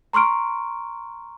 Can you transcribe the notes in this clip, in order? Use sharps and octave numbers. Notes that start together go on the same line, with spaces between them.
A#5 C6 C#6 F6 D7